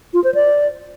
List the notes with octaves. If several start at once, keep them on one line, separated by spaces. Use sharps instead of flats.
F4
C5
D5